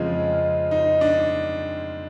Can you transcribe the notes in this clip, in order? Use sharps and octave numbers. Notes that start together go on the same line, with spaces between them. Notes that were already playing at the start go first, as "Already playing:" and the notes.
Already playing: F2 C#3 F3 G#3 C4 F4
D#4
D4